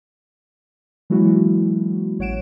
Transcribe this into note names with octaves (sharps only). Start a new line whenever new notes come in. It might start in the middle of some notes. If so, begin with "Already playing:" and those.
E3 F#3 G#3 A#3 E4 F#4
A1 C#5 F#5 D7 E7